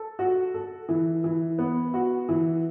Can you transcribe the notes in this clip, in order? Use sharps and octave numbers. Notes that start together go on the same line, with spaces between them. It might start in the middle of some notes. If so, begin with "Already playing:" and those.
Already playing: A4
F#4
A4
E3
E3
B3
F#4
E3